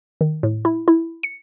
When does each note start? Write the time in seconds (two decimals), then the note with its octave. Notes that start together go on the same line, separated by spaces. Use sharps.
0.21 D#3
0.43 A2
0.65 E4
0.88 E4
1.23 C#7